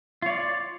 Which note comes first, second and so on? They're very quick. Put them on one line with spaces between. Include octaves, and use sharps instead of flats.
F4 C#5 D5